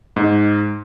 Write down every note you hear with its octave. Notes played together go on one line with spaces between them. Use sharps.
G#2 D#4